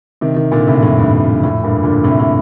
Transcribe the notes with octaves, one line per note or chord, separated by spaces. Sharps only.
C3 D#3
C3 D#3
A#2 D3
A2 C3
F2 A2
G2
G2
G2
F2 A2
G2 A#2
A#2 D3
A2 C3
A2